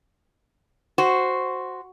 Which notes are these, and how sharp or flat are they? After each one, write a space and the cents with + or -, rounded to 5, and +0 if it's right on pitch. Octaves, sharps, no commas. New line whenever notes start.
F#4 +0 C5 +0